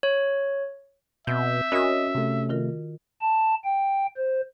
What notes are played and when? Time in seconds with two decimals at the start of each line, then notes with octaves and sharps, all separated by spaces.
0.03 C#5
1.27 B2 C4 E5 G6
1.72 C#4 F#4 A#4 D#5 B5 D#6
2.15 C3 A3
2.49 D#3 F4 A#4
3.21 A5
3.65 G5
4.17 C5